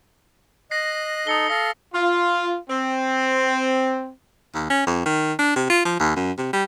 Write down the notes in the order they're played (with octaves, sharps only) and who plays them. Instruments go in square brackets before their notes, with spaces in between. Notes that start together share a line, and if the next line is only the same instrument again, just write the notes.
[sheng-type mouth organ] D#5 F#6 [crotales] A#6 C7
[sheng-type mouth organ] D#4 A4 [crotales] D#6 C#7 G7
[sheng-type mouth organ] A4 F5 [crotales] A#6
[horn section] F4
C4
[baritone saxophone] D#2
C#4
F2
D#3
D4
C3
F4
F3
D#2
F#2
C3
G3